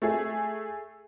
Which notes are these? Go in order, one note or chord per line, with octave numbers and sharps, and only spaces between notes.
A3 G#4